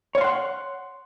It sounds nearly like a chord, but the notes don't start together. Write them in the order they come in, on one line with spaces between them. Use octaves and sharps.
C#5 F5 C6 F#5